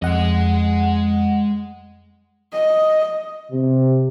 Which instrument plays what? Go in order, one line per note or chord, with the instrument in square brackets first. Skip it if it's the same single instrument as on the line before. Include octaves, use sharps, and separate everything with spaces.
[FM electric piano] F2 F#5 [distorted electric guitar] G#3 D#5
[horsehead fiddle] D#5
[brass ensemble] C3